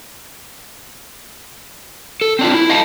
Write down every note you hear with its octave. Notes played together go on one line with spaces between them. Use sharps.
A4
C4 D4 F4
E4
D#5 F5 A5